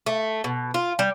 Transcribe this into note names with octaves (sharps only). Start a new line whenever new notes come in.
A3
B2
F4
G3